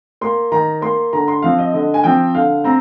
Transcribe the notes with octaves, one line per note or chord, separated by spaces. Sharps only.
A#3 C6
D#3 A#5
A#3 C6
D3 A#5
C6
F3 C4 F5
D#5
D3 D#5
G#5
F3 C4 G5
D3 F5
C4 A#5